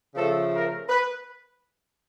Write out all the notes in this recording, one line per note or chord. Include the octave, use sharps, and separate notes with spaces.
C#3 F3 A3 A4
A#4
B4